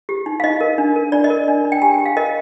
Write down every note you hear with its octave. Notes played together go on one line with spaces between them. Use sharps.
G4
D#4
F5
D#4 D#5
A#4
D4
A#4
D4 D5
D#5
A#4
D4
D4
G5
G4 G#5
G4 G5
F5
A#4 D#5